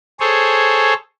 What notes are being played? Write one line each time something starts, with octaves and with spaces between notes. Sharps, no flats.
G#4 A4 C5 C#5